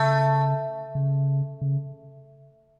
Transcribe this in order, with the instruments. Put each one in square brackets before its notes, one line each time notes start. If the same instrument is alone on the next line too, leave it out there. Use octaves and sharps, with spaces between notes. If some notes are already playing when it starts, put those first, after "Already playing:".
Already playing: [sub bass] C#3 [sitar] A3
[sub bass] C#3
C#3